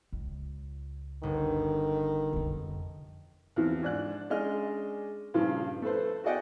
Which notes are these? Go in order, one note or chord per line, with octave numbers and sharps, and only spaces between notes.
C#2
G1 D#3
F2 C3
E2 C3 F3
G#2 D4 F#6
G#3 C#4 D4 D#5 F6
G2 A#2 C#3 F3 F4 F5
A3 A4 B4 C5
F#4 G#4 D5 D#5 F#5 G5